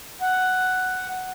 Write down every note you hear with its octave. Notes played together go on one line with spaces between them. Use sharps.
F#5